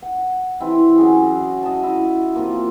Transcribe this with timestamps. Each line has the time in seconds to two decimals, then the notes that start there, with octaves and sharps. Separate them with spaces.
0.02 F#5
0.60 C3 E3 C4 E4
0.98 F#3 C#4 F#4 G#4
1.63 D#5 A5
1.83 E4
2.35 C3 F3 A#3 F4